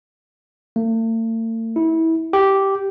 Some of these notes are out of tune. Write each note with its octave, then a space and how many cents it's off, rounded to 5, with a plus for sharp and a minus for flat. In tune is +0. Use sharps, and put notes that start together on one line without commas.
A3 +45
E4 -25
G4 -5